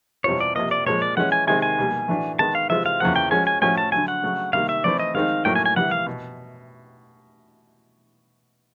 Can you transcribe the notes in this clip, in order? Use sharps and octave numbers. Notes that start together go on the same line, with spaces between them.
E2 B2 G3 C4 F4 C#5
D5
C3 F3 A#3 D#5
D5
A#2 F3 G#3 C#5
D5
E3 G#3 C#4 F#5
G#5
C3 D#3 G#3 C4 G#5
G#5
B2 G3 A#3
A2 E3 A3 D4 F#4
D#3 G#3 B3 A5
F5
C3 E3 G#3 C4 F4 E5
F5
E2 C#3 F3 A#3 F#5
G5
F3 G#3 C#4 F#4 G#5
G#5
A2 F3 A3 C#4 F#4 G#5
A5
D3 F#3 A3 G#5
F#5
C#3 F#3 A3
C3 D#3 G3 A#3 F5
E5
E3 A3 C4 E4 D5
D#5
D#3 G#3 C4 D#4 F5
A2 F#3 A#3 G5
G#5
G#5
C3 E3 G3 F#5
F5
B2